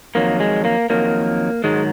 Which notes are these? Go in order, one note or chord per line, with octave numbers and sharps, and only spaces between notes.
F2 D#3 F#3 A#3
G#3
A#3
F2 D#3 F#3 A#3
G#2 D#3 F#3 G#3